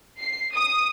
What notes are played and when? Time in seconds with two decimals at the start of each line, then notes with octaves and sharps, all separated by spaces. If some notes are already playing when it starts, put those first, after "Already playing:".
0.20 C7
0.55 D#6